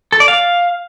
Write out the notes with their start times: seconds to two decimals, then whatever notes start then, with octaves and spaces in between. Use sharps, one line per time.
0.12 A4
0.20 D5
0.28 F5